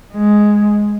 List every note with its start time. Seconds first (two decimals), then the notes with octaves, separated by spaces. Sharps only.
0.14 G#3